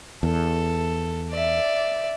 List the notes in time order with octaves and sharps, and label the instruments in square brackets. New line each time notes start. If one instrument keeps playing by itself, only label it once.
[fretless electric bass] E2 [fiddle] A4
[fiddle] D5 E5